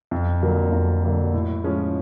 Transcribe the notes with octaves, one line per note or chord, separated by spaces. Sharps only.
F2
D3 F#3 A#3
F2
D3 F#3 A#3
A2
F3 G#3 C#4